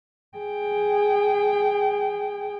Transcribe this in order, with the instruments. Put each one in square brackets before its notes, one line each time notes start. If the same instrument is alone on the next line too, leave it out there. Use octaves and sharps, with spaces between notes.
[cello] G#4 G5